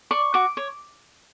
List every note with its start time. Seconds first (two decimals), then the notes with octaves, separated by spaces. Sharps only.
0.11 D5 C#6
0.34 F#4 D6
0.57 C#5